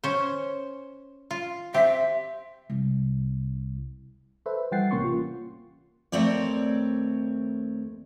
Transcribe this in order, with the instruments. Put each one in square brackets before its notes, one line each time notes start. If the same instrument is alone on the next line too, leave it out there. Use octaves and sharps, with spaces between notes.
[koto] C#4 C5
F4
[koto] C4 G4 [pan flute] E5
[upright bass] C2
[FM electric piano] A4 B4 C5 E5
E3 G3 F#5 G5 A6 C7
A1 C3 A#3 C#4 C6 C#6
F4
[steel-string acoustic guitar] D#2 A3 C4 C#5 D5